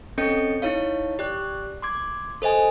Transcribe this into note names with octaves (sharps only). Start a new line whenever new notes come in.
C4 C#4 A4 D#5 G6 C#7
D#4 E4 C#5 F5
G4 D5 F#6
C6 D6 G#6
A4 C5 D#5 G#5